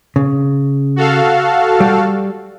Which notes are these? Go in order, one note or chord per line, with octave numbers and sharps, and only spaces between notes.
C#3
F#4 A4 F5
G3